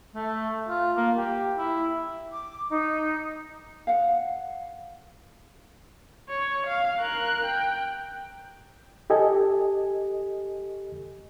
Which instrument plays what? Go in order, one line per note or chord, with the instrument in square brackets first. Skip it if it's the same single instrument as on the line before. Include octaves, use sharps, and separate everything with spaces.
[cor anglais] A3
F4
A#3
G4
E4
[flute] D6
D#4
[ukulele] F5 F#5
[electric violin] C#5
F5
A#4 F#6
G5
[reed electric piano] G4 A4 D#5 G#5